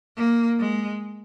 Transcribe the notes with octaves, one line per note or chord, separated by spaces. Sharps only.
A#3
G#3